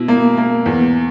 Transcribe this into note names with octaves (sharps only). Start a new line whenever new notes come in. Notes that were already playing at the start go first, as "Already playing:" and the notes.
Already playing: B2 E4
A#3
A#3
E2